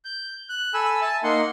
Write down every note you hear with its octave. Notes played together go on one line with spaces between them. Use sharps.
G6
F#6
A4 G#5 B5 E6
E5 G#5 A5
A#3 D#4 F#5 C6